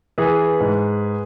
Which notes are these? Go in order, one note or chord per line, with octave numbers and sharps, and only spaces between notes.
E3 G#4 B4
G#2